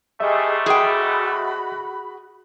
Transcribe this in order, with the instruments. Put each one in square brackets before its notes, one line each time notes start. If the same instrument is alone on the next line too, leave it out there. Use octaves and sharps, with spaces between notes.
[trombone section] G#2 G3 A3 [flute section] G4 G#4 [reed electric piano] D#5 E5
[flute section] F#4 B5 [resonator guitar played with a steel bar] G#4 G5